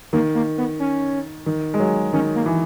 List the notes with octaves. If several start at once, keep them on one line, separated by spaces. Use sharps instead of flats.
D#3 A#3
A#3
B3
C#4
D#3
G#3
F#3
D#3 C#4
A#3
E3